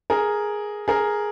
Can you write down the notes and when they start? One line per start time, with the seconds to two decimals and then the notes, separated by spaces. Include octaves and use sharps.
0.10 G#4 A#4
0.88 G#4 A#4